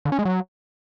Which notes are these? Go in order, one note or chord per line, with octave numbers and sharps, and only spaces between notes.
D3
C#4
G#3
F#3